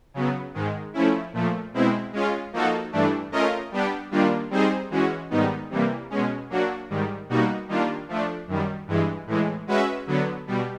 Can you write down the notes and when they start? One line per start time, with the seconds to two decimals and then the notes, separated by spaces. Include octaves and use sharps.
0.14 C#3 F#3 B3
0.54 G#2 D#3 G#3
0.94 F3 A3 C#4 E4
1.33 A#2 F3 A3
1.74 B2 G#3 C4 E4
2.13 G#3 C#4 F4
2.53 F3 A#3 D#4 F#4 A4
2.92 G2 E3 A3 D4
3.32 A3 C#4 F4 A#4 D#5
3.72 G3 B3 D4 G4
4.11 D#3 G3 A#3 D4 F4
4.51 G3 C4 D#4 G#4 C5
4.90 E3 G#3 C#4 F#4
5.30 G#2 D#3 G3 B3 D#4
5.70 C3 E3 G3 A#3
6.10 B2 G#3 C#4
6.50 F#3 A#3 D4 F#4
6.90 G#2 D#3 G3
7.29 B2 G3 A#3 D#4 F#4
7.68 D#3 G3 A#3 D4 F4
8.08 F3 A3 D4
8.48 F#2 D#3 G3
8.87 G2 E3 G#3
9.27 A2 E3 G#3
9.67 G#3 C#4 F#4 B4 E5
10.07 D3 F#3 B3
10.47 B2 G3